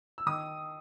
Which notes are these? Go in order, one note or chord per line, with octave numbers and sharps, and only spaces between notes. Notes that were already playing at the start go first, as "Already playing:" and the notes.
E6
D#3 D#6